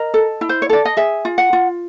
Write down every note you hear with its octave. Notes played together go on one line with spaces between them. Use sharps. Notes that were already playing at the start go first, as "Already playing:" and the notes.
Already playing: A#4 D#5
A4
E4
C5
C#5
A4 D5
D#5
G#4 E5
F4
F#5
F4